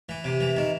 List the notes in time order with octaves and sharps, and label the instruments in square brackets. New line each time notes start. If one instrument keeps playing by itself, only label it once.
[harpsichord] E3
C3
E3
D#3